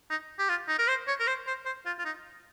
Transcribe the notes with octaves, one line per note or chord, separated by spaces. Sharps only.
D#4
G4
F4
D#4
A#4
C5
C#5
A#4
C5
C5
C5
F4
F4
D#4